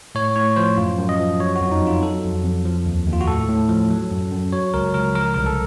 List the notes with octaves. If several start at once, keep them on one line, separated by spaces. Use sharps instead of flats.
A2 C#5
A2 C#5
F3 C5
F#2 F4
F#2
D#5
F3
F#3 C#5
F#4
F2
D#4
F2 F4
F#3 A4
F2
F2
F3
D#2
D#2
F4
F#4
A2 A4
A2
F3
F#3
F#2
F#2
F#3 C#5
C#2 A#4
C#2 A#4
F3 A#4
C2 A#4
A4